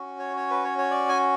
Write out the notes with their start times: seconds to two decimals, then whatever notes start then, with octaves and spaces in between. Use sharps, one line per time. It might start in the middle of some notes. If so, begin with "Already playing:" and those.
Already playing: C#4 F#4
0.19 C#5
0.36 C#5
0.50 B4
0.64 C#5
0.78 C#5
0.91 D5
1.09 G#5